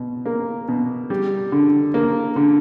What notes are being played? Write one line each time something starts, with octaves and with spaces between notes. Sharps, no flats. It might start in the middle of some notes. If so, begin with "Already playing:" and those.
Already playing: B2
A#3
B2
G3
D3
A#3
D3